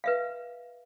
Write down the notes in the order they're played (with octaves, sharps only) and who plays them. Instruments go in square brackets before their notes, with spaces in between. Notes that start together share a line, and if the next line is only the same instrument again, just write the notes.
[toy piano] B4 E5 F5